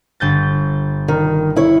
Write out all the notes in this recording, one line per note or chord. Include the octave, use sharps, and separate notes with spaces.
G1 G6 A6
D#3
E4 C#5